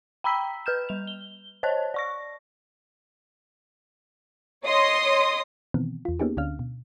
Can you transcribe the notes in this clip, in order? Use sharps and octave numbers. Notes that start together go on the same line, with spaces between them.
G5 A#5 B5 E6 B6
B4 F6 G6 E7
G3 F7
G7
C5 C#5 D#5 A5 F#6
D5 C#6 A#6
C#5 D#5 C6 D#6
B2 D#3 E3 B3 C4
E2 F4
A#3 B3 C#4 D#4 G4 G#4
D2 D3 C#4 D4 F5 F6
B2